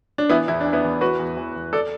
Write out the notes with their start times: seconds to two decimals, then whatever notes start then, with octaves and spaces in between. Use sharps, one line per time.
0.18 D4
0.29 E3 B3 E4
0.48 E2 E4
0.61 E3 D4
0.73 B3 E4
0.84 E2
1.01 E3 F#4 B4
1.19 E2
1.37 E3
1.56 E2
1.73 A4 D5